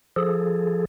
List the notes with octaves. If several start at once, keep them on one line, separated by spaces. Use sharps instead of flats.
F3 G#4 A4